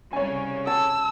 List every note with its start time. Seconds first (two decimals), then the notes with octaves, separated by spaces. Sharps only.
0.13 C2 C#3 C#5 G#5
0.67 A5 E6